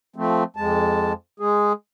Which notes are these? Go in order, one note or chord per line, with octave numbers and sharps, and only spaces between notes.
F3 A3 C4
F2 G#3 A5
G#3 G#4